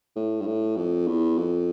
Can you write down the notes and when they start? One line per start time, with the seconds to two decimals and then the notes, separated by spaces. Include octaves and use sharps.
0.16 A2
0.41 G2
0.47 A2
0.77 F2
1.08 E2
1.38 F2